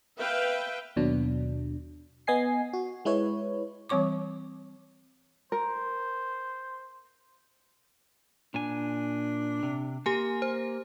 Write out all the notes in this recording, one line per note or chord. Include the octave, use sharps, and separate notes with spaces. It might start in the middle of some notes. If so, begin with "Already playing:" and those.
B4 E5 F5 G5
D#2 B2 F#3 D4
B3 D#5 G#5 C7
F#4
G#3 E4 B4 C#5
E3 G3 C4 C#5 C#6 D6
A#4 C5
A#2 D4 G#5
C3
A#3 G4 G#5
C5